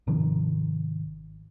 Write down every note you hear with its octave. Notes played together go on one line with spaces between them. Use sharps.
G#1 C3 D#3 F3